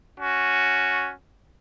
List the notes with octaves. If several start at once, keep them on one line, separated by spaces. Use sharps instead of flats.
C#4 F#4